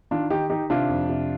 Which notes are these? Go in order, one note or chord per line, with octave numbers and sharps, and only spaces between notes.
D#3 D4 F4
D#3 D#4 G4
D#3 D#4 G4
C3 D4 F4
F2
C3